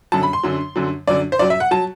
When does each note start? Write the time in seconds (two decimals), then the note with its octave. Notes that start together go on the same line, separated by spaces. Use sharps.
0.12 F#2 D3 F#3 A5
0.23 B5
0.33 C6
0.44 F#2 D3 F#3
0.76 F#2 D3 F#3
1.07 F#2 D3 F#3 D5
1.32 C5
1.39 F#2 F#3 D5
1.50 E5
1.60 F#5
1.71 F#3 A5